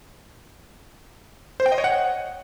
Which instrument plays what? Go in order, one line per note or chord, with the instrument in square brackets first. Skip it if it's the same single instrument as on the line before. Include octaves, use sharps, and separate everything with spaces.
[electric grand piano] C5
G5
D#5
C#5
F#5